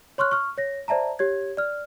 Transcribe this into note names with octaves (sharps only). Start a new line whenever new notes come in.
C#5 C6 C#6 F6 F#6
C#6 F6
C#5 A#6
C5 D5 E5 A5 A#5
G4 C#5 G#6
D5 F6